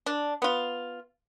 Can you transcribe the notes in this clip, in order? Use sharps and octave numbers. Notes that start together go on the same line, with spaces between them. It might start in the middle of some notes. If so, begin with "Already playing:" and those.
D4
B3 F4